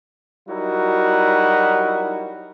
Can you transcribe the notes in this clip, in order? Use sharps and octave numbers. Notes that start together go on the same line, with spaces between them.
F#3 G3 D#4 E4 F#4 A#4